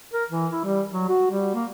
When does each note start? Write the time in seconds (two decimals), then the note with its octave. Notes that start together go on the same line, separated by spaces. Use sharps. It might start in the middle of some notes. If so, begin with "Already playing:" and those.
0.13 A#4
0.30 E3
0.52 E4
0.64 G3
0.92 F#3
1.08 F#4
1.31 G3
1.54 A#3